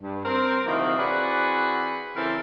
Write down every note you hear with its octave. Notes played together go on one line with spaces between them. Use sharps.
G2
C4 A#4
D2 C3 D#3 E3 F#3 A#3
E3 C4 F#4 G#4 B4 D5
C#3 E3 C4 E4 A4 A#4